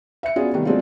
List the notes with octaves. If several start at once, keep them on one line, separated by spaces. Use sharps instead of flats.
E5 C#7
B3 C#4 D4 F4 F#4 G#4
C3 D#3 G3 A3 B3
F#3 G#3 A3 C4 D4 F4